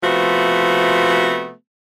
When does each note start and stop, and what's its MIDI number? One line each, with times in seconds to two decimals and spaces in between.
0.03 1.51 48
0.03 1.51 53
0.03 1.51 57
0.03 1.51 59
0.03 1.51 66